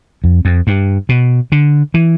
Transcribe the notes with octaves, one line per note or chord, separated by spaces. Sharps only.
F2
F2
G2
B2
D3
E3